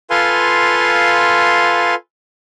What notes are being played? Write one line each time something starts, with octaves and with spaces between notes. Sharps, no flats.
F4 A4 B4 F5 G#5 C6